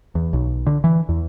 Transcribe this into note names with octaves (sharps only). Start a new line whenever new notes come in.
E2
B1
D3
E3
E2